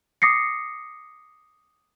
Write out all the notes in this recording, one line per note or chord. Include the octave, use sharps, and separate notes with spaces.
D6 D#6 A#6 C7 C#7